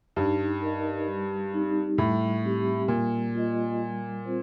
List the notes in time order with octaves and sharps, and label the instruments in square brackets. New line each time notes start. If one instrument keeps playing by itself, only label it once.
[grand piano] G2 [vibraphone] D#4
[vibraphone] A#4 D#5
G3
C4 D#4 G4
[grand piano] A2 [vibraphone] G3
[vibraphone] C4 G4
[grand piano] A#2 [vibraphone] G3
[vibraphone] A#3 F4 A#4 D#5
G3
C4 F4 C5